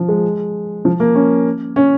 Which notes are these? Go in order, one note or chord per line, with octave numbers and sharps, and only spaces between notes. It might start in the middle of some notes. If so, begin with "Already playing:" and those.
Already playing: F3
G#3
F3
A#3
C#4
C#4